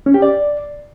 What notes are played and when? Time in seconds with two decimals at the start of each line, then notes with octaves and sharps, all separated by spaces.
0.06 C#4
0.14 G4
0.22 D5